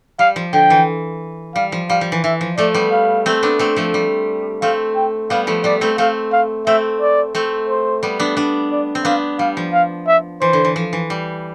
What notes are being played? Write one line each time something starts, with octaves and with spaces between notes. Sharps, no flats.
G3 F5
F3
D3 G5
E3
G3 F5
F3
G3 F5
F3
E3
E3 E5
F3
F3 A3 D5
G3 B3
F5
A3 C4
B3 D4
A3 C4
F3 A3
G3
A3 C4 F5
G5
G3 B3 F5
F3 A3
G3 B3 D5
A3 C4
A3 C4 F5
F5
A3 C4 E5
D5
A3 C4
C5
G3 B3
B3 D4
B3 D4
D5
C4
B3 D4 F5
G3 F5
F3
F5
E5
E3 C5
D3
E3
F3
E3
G3